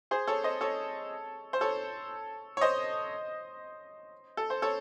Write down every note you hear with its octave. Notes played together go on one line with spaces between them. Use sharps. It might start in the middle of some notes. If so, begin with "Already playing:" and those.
G#4 C5
A4 C#5
C5 D#5
A4 C#5
C5
A4 C#5
C#5
C5 D#5
A4
C5
A4 C#5